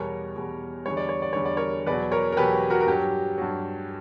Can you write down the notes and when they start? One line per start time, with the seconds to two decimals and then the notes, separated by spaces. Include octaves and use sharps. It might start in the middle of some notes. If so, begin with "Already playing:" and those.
Already playing: E2 B2 G3 A#4 C#5
0.35 E2 B2 G3
0.86 E2 D3 G3 C#5
0.97 D5
1.09 C#5
1.22 D5
1.33 E2 D3 G3 C#5
1.45 D5
1.57 A#4 C#5
1.86 E2 B2 F#3 B4 D5
2.12 A#4 C#5
2.32 A#4
2.37 E2 B2 F#3 G4 B4
2.70 F#4 A#4
2.81 A#4
2.87 G2 F#3 G4
3.38 G2 F#3